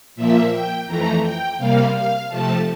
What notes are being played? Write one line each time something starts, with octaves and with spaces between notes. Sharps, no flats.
A#2 F3 A#3 E5
G5
F2 E3 A3 A#5
G5
C3 G3 A#3 F5
F5
C3 F3 A3 A5